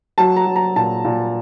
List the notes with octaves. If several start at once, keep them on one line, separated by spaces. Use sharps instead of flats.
F#3 A5
A#5
F#3
A#5
A#2 A5
A#2